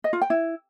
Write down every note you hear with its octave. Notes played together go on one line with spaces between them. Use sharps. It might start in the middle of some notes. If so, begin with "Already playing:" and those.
D#5
F4
G5
E4